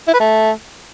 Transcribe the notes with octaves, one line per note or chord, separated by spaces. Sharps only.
E4
B4
A3